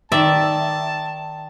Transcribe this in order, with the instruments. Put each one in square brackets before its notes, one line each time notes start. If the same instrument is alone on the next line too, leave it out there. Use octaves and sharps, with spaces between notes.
[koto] D#3 D5 E5 [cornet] A5